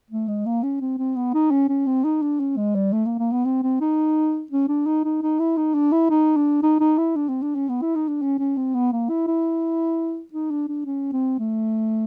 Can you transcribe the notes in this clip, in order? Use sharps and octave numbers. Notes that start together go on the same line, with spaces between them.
A3
G#3
A#3
C#4
C4
C4
B3
D#4
C#4
C#4
C4
D#4
D4
C#4
G#3
G3
A3
A#3
A#3
B3
C4
C4
D#4
C#4
D4
D#4
D#4
D#4
E4
D#4
D4
E4
D#4
D4
D#4
D#4
E4
D4
C4
D4
C#4
B3
E4
D#4
D4
C#4
C#4
C4
B3
A#3
E4
E4
D#4
D4
D4
C#4
C4
A3